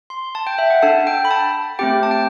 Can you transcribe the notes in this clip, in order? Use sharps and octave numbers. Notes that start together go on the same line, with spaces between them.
C6
A5
G5
E5
F#5
D4 A4 A5
G5
B5
A5
A3 C4 G4 G5
A5
G5